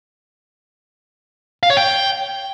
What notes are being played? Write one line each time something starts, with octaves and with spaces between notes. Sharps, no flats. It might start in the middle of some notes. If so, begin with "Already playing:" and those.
F5
C#5
G5